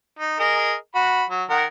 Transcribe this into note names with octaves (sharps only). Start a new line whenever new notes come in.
D#4
G#4 A#4 D#5
F#4 B5
F#3
D#3 A#4 F#5